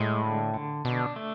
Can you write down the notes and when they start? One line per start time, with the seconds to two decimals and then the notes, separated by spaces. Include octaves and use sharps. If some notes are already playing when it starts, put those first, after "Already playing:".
Already playing: A2 G#3
0.24 D3
0.54 D3
0.85 B2 D4
1.16 A3